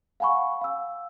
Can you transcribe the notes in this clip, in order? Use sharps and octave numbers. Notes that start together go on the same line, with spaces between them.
F5 F#5 G#5 B5 C#6
F5 E6